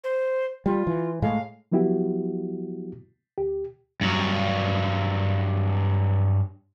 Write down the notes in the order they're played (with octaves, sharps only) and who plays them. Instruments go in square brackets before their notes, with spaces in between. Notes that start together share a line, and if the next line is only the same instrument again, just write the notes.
[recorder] C5
[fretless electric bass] G3 [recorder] F4
[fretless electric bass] E3
[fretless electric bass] A2 G#3 [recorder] F5
[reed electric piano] F3 F#3 B3 E4 F#4 G4
D2 G4
[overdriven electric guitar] G2 F#3